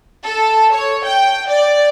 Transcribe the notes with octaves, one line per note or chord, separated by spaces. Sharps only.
A4
C#5
G5
D5